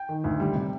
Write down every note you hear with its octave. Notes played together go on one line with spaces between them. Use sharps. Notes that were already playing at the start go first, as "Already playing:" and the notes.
Already playing: G5
D#3
D2
G3
C3